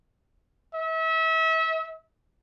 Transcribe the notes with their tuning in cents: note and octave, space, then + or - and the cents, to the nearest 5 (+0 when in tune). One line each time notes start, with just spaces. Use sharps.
E5 -35